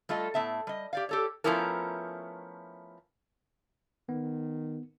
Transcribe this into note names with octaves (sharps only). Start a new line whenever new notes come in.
G3 A3 F4 A4 D#5
A2 B3 E5 A5
G3 D#5
G4 D5 F5
G4 A4 C#5
F3 A3 B3 C#4 E4 A#4
D#3 B3